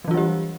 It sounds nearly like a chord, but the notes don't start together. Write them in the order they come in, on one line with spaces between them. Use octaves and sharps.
F#3 E3 F4 G3 G4